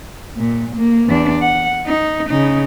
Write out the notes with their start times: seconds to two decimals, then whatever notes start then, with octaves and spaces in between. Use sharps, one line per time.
0.37 A#2
0.76 A#3
1.09 E2 D4
1.41 F#5
1.86 D#4
2.29 C#3 D#4